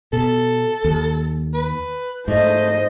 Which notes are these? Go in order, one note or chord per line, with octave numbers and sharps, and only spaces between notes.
B2 A4
D#2
B4
G#2 A3 C5 D#5